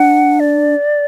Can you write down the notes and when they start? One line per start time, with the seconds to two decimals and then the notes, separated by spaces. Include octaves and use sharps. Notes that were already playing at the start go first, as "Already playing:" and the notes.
Already playing: D4 F#5
0.40 D5